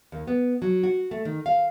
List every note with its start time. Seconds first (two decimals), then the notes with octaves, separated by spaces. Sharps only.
0.12 D#2
0.27 B3
0.62 F#3
0.83 F#4
1.11 A3
1.25 D#3
1.46 F5